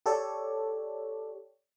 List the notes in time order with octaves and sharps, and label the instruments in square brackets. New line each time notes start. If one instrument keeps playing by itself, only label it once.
[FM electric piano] G4 A4 C#5 D5